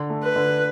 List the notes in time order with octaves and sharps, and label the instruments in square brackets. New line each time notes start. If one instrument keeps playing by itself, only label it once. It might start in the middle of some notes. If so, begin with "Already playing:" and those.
Already playing: [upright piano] D3
A3
[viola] B4
[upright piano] D3